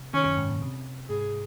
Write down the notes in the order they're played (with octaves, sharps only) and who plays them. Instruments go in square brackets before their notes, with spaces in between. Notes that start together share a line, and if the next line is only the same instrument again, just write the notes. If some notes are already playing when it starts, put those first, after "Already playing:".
Already playing: [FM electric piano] C3
[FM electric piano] D#3 [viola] C#4
[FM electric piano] F#2
G#2
A#2
C3
[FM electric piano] G#2 [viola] G#4